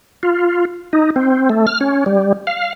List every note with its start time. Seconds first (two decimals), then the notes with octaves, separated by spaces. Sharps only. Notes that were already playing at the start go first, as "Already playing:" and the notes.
0.23 F4
0.93 D#4
1.16 C4
1.50 A3
1.67 F6
1.81 C#4
2.06 G3
2.47 F5